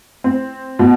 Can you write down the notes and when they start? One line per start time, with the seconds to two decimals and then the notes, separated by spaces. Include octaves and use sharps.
0.24 C4
0.79 B2